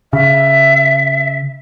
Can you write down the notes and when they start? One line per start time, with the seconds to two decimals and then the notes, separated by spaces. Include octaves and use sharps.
0.13 C#3 E5